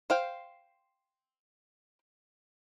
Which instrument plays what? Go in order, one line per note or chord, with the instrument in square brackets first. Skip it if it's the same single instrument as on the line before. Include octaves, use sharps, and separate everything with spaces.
[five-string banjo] C5 F5 G5